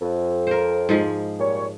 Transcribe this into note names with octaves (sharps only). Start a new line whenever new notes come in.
F2
A#4 C5
G#2 F3 G#3
A#2 G3 C#5